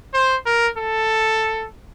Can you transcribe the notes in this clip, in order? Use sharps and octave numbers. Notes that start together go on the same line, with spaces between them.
C5
A#4
A4